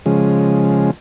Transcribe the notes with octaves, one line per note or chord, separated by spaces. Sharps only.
C#3 F3 G#3